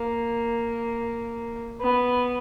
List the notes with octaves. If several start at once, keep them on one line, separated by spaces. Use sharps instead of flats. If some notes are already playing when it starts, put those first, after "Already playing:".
Already playing: A#3
B3